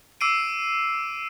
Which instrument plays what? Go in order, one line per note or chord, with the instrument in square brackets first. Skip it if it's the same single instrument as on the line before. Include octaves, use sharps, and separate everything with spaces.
[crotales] D6 E6 C7 D7 D#7